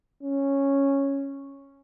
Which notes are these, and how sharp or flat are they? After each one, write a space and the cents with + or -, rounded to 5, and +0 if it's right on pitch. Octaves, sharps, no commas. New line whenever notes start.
C#4 -5